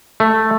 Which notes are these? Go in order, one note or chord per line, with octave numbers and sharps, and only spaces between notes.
A3